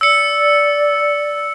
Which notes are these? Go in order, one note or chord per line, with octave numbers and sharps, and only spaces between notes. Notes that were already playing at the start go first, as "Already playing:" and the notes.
D5 E6 C#7